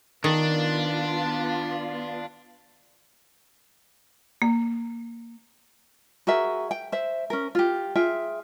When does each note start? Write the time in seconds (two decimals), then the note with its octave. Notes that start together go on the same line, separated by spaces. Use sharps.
0.24 D#3 B3 D4 F4
4.42 A#3
6.27 F#4 G#4 A#4 E5
6.71 G5
6.92 C5 E5
7.30 C#4 A#4
7.55 F4 G4
7.96 F4 G#4 E5 G5